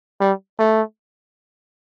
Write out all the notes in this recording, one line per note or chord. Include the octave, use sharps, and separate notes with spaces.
G3
A3